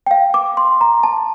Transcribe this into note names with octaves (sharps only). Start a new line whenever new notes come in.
G5
F5
D6
C6
A#5
A5